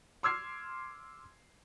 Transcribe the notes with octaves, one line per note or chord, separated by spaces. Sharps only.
C6 D6 E6 F6 G#6 C7